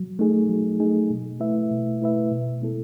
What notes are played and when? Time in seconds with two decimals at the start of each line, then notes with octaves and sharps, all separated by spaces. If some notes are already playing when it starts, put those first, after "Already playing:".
Already playing: F#3
0.19 A3 D#4 G#4
0.49 F#3
0.80 A3 D#4 G#4
1.10 B2
1.40 A3 E4 B4 E5
1.71 B2
2.01 A3 E4 B4 E5
2.31 B2
2.62 G#3 B3 E4 A4